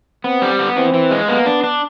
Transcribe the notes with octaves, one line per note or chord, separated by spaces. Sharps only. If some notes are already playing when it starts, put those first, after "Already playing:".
B3 C4
G3
B3
E3 C4
E3
G#3
A#3 B3
D4
D4